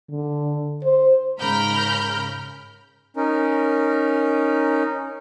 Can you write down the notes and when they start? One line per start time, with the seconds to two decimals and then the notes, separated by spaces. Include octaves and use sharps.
0.11 D3
0.84 C5
1.39 G#2 C#3 A#4 B5 F6 G6
3.17 C#4 D#4 A#4